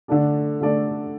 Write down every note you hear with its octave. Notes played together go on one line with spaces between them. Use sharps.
D3 A3 D4 A4 D5
D3 A3 D4 A4 D5